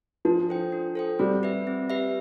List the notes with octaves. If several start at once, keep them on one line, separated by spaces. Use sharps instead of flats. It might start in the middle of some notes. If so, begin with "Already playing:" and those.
F3 D4
A4 C5 G5
D4
A4 C5 G5
G3 C4
G4 B4 E5
C4
G4 B4 E5